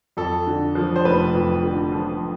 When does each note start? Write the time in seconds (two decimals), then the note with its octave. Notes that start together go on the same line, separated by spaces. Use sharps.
0.17 F2 A4
0.47 D3
0.75 F3
0.96 C5
1.05 F1 B4
1.35 F2
1.63 D3
1.92 F3